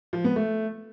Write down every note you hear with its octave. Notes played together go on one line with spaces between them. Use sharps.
F3
B3
A3